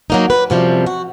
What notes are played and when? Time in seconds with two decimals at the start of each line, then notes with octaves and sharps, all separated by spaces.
0.10 F#3 A#3 D#4
0.30 B4
0.50 F#2 C3 F3 G3
0.86 F#4